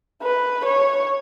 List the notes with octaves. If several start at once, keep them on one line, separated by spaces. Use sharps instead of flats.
B4
C#5